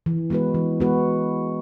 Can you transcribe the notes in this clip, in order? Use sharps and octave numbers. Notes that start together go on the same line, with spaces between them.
E3
G#3 B3 F#4 B4
E3
G#3 B3 F#4 B4